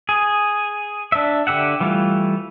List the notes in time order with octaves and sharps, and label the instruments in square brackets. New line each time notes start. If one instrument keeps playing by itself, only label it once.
[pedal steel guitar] G#4
D4 E5
D3 G4 E5 F#5
E3 G3 A3 F4